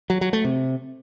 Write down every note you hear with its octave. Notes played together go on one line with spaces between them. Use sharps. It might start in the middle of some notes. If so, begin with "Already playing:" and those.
F#3
F#3
A3
C3